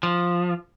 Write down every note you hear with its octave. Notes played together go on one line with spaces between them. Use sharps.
F3